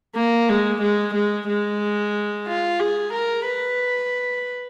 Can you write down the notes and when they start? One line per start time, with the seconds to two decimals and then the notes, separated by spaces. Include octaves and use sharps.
0.16 A#3
0.49 G#3
0.81 G#3
1.14 G#3
1.48 G#3
2.47 F4
2.80 G#4
3.13 A#4
3.46 B4